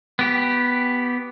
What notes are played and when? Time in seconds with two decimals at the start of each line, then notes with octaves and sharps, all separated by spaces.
0.19 B3 G4